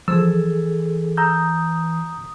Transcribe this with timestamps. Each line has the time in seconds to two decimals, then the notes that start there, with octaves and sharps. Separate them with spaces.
0.08 E3 F3 G#4 A4 E6
1.17 A#5 D#6 E6 G6